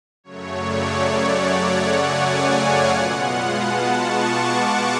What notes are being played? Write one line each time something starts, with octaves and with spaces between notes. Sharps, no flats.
F#2 C#3 F#3 A3 C#5
D5
D5
F#5
F#5
G#5
D5
F5
B2 G#3 B3 F4 F#5
A5
C#6
D6
C#6